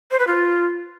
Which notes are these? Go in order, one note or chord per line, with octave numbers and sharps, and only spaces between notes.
C5
B4
F4